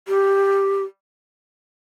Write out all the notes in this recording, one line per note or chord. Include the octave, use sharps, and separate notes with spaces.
G4